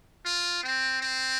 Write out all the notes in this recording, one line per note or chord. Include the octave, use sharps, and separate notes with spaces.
F4
C4
C4